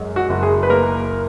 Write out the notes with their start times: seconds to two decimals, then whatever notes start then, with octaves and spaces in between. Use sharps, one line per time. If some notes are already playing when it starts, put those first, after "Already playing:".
Already playing: F#2 G#3
0.16 F#4
0.30 F#1
0.43 G#4
0.63 B4
0.70 A#3 A#4